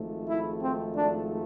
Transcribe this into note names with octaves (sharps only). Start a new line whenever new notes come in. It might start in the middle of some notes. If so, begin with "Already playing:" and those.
Already playing: G#1 G#2 F3 A3
E4
C4
D4